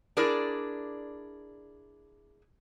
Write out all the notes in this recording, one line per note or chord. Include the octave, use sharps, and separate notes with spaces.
D4 E4 G#4 A#4 D5